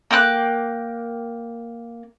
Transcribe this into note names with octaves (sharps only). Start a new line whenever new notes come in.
A#3 G5 D6 F#6